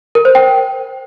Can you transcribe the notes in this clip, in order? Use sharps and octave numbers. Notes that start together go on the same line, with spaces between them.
A#4
C5
G5